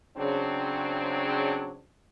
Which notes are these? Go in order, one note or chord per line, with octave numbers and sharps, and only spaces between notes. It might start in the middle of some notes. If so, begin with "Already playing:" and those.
C#3 F#3 C4 D4